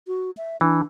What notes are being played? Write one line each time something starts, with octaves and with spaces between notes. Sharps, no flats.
F#4
E5
E3 D4